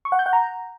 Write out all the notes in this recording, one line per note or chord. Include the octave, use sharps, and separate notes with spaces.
C#6
F#5
G6
F#5
A#5